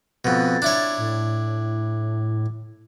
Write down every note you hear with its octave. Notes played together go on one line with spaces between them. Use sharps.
F2 B2 A6
D4 E4 C#5
A2